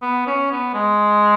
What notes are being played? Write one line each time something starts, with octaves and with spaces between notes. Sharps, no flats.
B3
C#4
B3
G#3